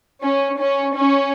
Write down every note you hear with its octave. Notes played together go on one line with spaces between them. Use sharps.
C#4
C#4
C#4